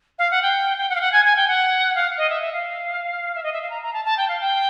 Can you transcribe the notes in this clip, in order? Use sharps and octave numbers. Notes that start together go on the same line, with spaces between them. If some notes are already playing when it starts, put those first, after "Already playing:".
F5
F#5
G5
G5
F#5
F5
F#5
G#5
G#5
G5
F#5
F5
D#5
E5
E5
F5
E5
D#5
E5
F5
A#5
A#5
A5
A5
G5
F5
G5